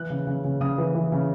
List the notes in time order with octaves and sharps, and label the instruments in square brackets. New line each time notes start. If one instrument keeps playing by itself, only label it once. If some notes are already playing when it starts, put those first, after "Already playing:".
Already playing: [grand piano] E3 F#6
C#3
C#3
C#3
C#3 D#6
E3
E3
C#3